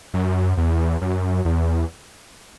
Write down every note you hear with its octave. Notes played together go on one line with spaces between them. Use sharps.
F#2
E2
F#2
E2